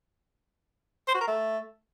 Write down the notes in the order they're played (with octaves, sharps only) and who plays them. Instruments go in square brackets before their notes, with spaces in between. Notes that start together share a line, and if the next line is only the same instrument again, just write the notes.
[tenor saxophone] C5
F#4
A#4
A3